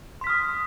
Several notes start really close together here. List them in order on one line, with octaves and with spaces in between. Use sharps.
C6 B6 F6 D#6